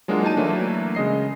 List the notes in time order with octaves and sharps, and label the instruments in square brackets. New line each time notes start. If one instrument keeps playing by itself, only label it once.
[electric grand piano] F#3 G#3 A#3 D4 F4 F#4
D#4 G#5 A5 D#7
E3 F#3 A3 A#3 D4
C#3 G#3 D#5 C7